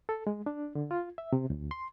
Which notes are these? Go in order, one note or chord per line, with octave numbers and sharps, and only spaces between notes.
A4
G#3
D4
D3
F4
E5
C3
D2
C6